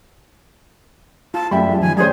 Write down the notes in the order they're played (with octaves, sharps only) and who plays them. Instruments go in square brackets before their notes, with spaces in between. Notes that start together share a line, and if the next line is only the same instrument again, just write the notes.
[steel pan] F4 [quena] A5
[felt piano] F#2 G5 B5 [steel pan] G3 [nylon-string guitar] A3 A4 [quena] E5
[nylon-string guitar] G#3 F4
[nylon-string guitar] D#3 F3 [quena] G#5
[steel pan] G3 C5 [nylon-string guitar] A3 C#4 D5 [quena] G#4